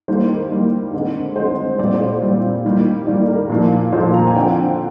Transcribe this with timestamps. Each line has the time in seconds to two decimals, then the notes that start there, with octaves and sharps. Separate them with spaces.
0.08 D#3 G3 A#3 C5
0.29 A#4
0.50 D#3 G3 A#3
0.93 D3 G#3 C4
1.36 D3 G#3 C4 C5
1.78 A#2 G3 C4 D5
1.94 C5
2.07 C5
2.22 A#2 G3 C4
2.64 D#3 G3 A#3
3.07 D#3 G3 A#3 D5
3.28 A#4
3.49 A#2 F3 A#3
3.92 A#2 F3 A#3 C5
4.14 A#5
4.27 G#5
4.35 D3 F3 C4 G5